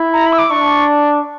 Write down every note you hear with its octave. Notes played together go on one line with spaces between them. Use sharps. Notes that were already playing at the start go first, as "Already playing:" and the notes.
Already playing: E4
A#5
B5
E6
D6
D4 C#6